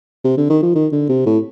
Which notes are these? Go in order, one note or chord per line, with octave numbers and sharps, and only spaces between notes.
C3
D3
D#3
F3
D#3
D3
C3
A2